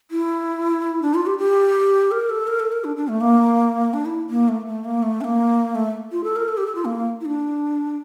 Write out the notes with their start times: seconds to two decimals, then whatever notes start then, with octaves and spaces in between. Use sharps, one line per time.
0.11 E4
1.02 D4
1.14 F4
1.26 G4
1.38 G4
2.11 A#4
2.30 A4
2.47 A#4
2.60 A4
2.72 A#4
2.84 D4
2.96 D4
3.08 A3
3.21 A#3
3.93 D4
4.05 E4
4.30 A#3
4.48 A3
4.66 A3
4.84 A#3
5.02 A3
5.21 D4
5.24 A#3
5.75 A3
6.12 F4
6.24 A4
6.36 A#4
6.48 A4
6.57 G4
6.66 A4
6.75 F4
6.85 A#3
7.21 E4
7.25 D4